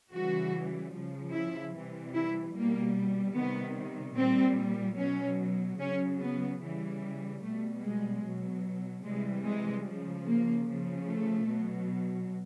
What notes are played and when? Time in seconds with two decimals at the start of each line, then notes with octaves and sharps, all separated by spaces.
0.12 C#3 E3 G3 F#4
0.93 C#3 F3
1.33 E4
1.74 C3 E3 G3
2.14 E4
2.55 B2 G3 A#3
3.36 C3 D#3 G3 B3
4.17 A#2 G3 C4
4.98 B2 F#3 C#4
5.80 C#3 F#3 C#4
6.21 B3
6.61 C#3 E3 G3
7.42 B2 G3 A3
7.83 G#3
8.23 B2 F#3
9.05 C3 E3 G3 G#3
9.46 G#3
9.86 C#3 F3
10.27 A#3
10.68 C#3 F3
11.08 A3
11.48 B2 F#3